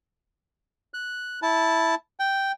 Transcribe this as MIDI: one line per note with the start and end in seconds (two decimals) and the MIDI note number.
0.94 1.40 90
1.42 1.95 64
1.42 1.95 81
2.20 2.52 79